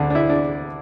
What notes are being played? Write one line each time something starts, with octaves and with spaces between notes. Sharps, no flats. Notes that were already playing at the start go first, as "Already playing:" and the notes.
Already playing: D2 D3 D4
D4
E4
D4